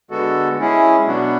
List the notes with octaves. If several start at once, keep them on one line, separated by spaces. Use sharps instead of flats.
D3 G#3 B3 F#4 A4
G#3 C#4 E4 G#4
B2 F#3 B3 D4 F#4